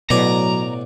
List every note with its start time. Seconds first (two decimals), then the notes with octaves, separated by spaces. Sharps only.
0.10 A1 B2 F#3 D5 G#5 A#5